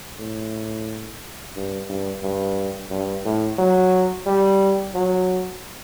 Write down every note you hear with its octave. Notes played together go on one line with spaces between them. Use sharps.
A2
G2
G2
G2
G2
A2
F#3
G3
F#3